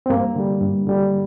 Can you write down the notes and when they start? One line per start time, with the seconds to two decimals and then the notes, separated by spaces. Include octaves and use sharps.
0.06 C4
0.10 G2 A#3
0.36 D3 G3
0.61 G2
0.87 D3 G3